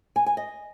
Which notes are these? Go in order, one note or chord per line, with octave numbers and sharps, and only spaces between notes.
G#5
G#5
D#5